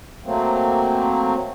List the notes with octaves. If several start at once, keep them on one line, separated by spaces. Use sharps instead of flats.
F#3 A3 A#3 C4